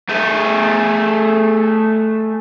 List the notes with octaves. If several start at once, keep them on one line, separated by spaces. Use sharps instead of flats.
A3 G#4